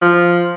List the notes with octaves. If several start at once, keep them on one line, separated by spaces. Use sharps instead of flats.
F3